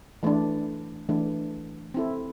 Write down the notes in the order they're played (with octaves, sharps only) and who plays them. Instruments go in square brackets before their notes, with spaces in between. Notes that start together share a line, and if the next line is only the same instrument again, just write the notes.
[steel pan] E3 A3 D4
E3 A3 D4
C4 E4 A4